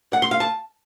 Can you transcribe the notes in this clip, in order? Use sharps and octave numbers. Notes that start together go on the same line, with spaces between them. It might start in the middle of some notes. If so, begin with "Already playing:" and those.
F#5
C6
F5
A5